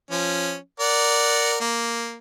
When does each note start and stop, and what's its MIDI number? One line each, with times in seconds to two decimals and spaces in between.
0.11 0.56 53
0.11 0.56 61
0.80 1.58 70
0.80 1.58 74
0.80 1.58 78
1.60 2.17 58